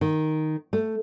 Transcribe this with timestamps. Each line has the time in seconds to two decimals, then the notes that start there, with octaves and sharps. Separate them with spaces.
0.01 D#3
0.73 A3